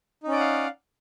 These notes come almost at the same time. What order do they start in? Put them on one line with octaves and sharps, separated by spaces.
D#4 C#4 D5 F#5 F5